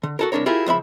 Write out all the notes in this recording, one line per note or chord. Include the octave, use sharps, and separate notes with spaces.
D3
F#4 A4 A#4
C2 B2 D4 A#4 C#5
E4 F4 G4 G#4 A#4
C#2 F3 E5 B5